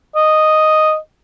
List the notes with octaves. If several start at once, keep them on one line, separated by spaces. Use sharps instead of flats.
D#5